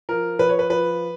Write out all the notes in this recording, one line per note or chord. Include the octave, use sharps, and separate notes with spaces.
F3 A#4
F3 B4
C#5
B4
F3 B4